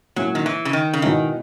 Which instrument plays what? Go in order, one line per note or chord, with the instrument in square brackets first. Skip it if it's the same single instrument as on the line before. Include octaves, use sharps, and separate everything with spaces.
[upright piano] A#2 G#3 C#4 E4 [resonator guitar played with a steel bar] F#3
[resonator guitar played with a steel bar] D#3
E3
C#3
D#3
C#3
[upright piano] B2 G#3 C#4 E4 [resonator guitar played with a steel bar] D#3